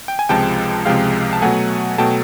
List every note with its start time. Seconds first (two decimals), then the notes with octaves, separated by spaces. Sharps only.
0.08 G5
0.19 G#5
0.29 C#2 C3 F3 G#3 G5 A5
0.85 C#2 C3 F3 G#3 F5 G5
1.33 A5
1.42 B2 F#3 A3 F#5 G#5
1.98 B2 F#3 A3 G5 A5